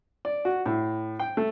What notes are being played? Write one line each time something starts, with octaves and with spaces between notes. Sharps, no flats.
D5
F#4
A2
G5
A3